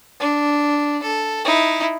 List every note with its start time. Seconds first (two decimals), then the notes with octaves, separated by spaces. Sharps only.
0.20 D4
1.03 A4
1.45 D#4 E4